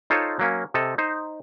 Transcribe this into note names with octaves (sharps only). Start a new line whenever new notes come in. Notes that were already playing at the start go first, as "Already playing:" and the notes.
D#4 F4 A4 C5 C#5
F#3 A#3 C#4
C3 A4 D#5
D#4 C5